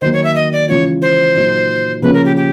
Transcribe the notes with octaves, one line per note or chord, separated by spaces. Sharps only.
D#3 F#3 A#3 C5
C#5
E5
D#5
D5
C#3 E3 G#3 C#4 F4 C#5
C5
A#2 F#3 A#3 D#4
C#3 F3 A#3 C#4 B4
A#4
G4
G4